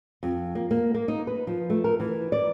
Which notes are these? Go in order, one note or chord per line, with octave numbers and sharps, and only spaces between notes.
F2
A#3
A#3
A#3
D#4
B4
F3
A3
A#4
E3
D5